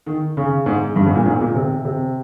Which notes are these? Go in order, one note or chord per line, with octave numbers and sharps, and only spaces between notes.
D#3
C#3
G#2
G2
G#2
A#2
G#2
A#2
C3
C3